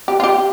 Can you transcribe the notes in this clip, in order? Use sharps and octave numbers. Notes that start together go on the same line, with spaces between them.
G4
F4
G4